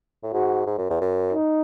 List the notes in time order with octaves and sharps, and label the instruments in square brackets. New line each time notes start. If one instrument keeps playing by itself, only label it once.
[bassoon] A2
[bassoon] G#2 [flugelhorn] F#4
[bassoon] G#2
F#2
E2
F#2
[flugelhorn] D#4